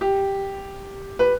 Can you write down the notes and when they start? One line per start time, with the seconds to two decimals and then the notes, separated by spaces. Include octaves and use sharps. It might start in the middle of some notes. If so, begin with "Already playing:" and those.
0.01 G4
1.19 B4